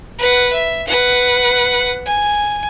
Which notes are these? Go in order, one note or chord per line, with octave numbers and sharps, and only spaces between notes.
B4 F#5
E5
B4 F#5
G#5